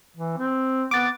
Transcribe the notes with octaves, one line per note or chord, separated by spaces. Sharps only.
E3
C4
B3 D6 A6